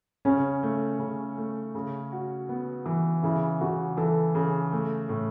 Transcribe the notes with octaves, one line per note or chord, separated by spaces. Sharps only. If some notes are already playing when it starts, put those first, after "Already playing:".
C#3 C#4
A3
C#3
A3
C#3
F#4
B3
E3
C#3 E4
C#3 F#4
E3 A4
C#3
A3
A2